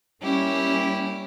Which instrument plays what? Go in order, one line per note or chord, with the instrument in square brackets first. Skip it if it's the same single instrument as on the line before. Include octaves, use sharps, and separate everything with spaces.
[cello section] G3 A#3 C#4 [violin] E4 G4